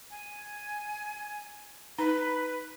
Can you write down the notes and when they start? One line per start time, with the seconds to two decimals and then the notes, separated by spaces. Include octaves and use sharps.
0.11 G#5
1.99 D#4 B4